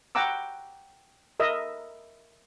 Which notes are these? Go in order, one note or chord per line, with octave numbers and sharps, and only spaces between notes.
F#5 G5 A#5 D6 E6
A#4 D#5 E5